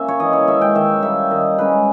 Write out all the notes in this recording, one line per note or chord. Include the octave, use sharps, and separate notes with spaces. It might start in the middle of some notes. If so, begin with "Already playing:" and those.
Already playing: A#3 C#4 E5
C#5
E3 D#5
C#5
G#3 C#4 E5
G5
D#3 E5
G3 A#3 E5
D#3 D#5
G#3 C#4 B4